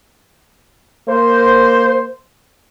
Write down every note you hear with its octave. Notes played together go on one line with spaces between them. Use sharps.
A#3 C5